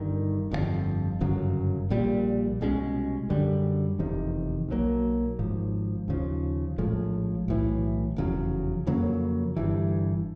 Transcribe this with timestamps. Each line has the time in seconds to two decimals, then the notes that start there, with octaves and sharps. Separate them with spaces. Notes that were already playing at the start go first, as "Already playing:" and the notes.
Already playing: G1 G2 D#3
0.51 G1 F2 C3 F3
1.21 G1 F#2 C#3 F#3
1.90 A#1 A#2 G3
2.61 C2 B2 G#3 C#4
3.30 F#2 D3 G3
3.99 F1 E2 C3 D#3
4.68 B1 A2 F#3 A#3
5.39 G#1 G#2 F3
6.08 D#2 C#3 F3
6.78 A#1 A2 F3 G#3
7.48 B1 A2 E3
8.16 F1 E2 C#3 F#3
8.87 F2 C#3 F#3 A#3
9.56 G1 G2 E3